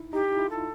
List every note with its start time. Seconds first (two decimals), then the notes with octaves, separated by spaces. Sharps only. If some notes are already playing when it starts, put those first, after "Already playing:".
Already playing: D#4 E4
0.13 D#4 G4
0.32 F4
0.38 E4
0.46 F4 A4